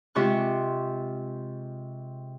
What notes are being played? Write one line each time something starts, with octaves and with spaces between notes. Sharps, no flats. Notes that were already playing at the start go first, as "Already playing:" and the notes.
C3 G#3 F4 C#6 F#6